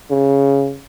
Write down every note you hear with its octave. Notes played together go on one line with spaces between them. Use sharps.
C#3